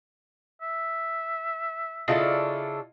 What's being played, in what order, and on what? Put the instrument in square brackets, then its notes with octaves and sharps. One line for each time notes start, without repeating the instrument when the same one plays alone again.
[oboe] E5
[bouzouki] C#3 D4 A4 [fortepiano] E4 F4 D#5